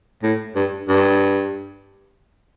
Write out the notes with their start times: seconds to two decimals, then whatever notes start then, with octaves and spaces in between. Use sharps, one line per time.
0.23 A2
0.55 G2
0.89 G2